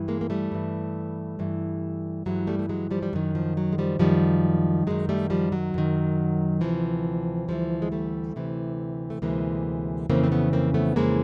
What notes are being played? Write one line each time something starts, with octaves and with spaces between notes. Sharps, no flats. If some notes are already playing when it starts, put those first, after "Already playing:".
Already playing: G2 E3
G#3 A#3
A#3
G3 A3
G2 E3
G2 E3
G2 E3 F#3 G#3
G3 A3
A3
F#3 G#3
F3 G3
G3
F#2 D#3 F#3
F3
F#3
G#3
F3 G3
F#2 D#3 F3 G3
F#2 D#3 F#3 G#3
G3 A3
F3 G3
F#3
F#2 D#3
D2 C3 E3 F3
D2 C3 E3 F3 G3
G#3
G3 A3
D2 C3 E3
A3
D2 C3 E3 G#3 A#3
F2 C#3 E3 A#3 C4
C4
A3 B3
A#3 C4
A3 B3
F2 C#3 E3 G#3 A#3